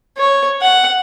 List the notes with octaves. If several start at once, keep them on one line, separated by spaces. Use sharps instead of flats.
C#5
F#5